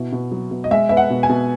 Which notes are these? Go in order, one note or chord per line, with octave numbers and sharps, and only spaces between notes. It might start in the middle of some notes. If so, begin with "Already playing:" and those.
Already playing: B2 E4
B2
F#3
B2
D#5
G#3 E5
B3 E5
F#5
B2
G#5
B2